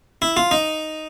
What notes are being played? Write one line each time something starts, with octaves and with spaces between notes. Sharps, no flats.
E4
F4
D#4